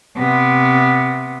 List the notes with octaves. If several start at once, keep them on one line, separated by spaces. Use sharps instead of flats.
C3 B3